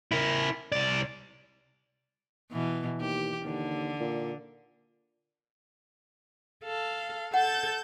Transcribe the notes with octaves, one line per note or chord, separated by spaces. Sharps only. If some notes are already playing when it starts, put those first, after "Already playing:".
E4 A#4
C2 D5
B2 E3
D#2 G4
D#2 D3
A#2
A4 F5
A4 F#5 G6 A6